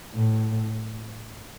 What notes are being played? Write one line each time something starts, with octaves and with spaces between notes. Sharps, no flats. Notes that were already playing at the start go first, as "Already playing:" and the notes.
A2